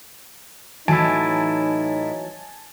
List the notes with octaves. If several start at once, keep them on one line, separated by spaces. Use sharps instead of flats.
A2 E3 F#3 D#4 E4 G#5 A5 D7